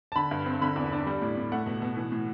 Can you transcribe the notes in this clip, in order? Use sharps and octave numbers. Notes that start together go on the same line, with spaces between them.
A5
D3 B5
G2
C4
D3 B5
E2
D4
G3
A2
A2
A3 F#5
B2
B2
E3
A2